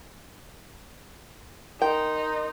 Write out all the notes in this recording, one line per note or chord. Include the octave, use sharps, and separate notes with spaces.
D#4 A#4 G5 C6